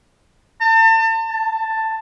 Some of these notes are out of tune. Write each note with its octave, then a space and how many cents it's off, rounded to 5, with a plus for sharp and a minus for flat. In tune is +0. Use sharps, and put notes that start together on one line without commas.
A5 +35
A5 +10